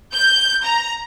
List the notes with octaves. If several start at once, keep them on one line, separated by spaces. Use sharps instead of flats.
G6
A#5